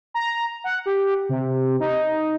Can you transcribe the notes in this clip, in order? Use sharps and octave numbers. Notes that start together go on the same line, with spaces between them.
A#5
F#5
G4
C3
D#4